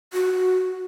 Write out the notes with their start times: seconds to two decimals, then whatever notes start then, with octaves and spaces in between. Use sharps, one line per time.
0.13 F#4